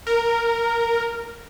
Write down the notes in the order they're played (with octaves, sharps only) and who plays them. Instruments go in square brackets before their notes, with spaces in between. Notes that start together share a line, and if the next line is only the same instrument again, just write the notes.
[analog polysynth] A#4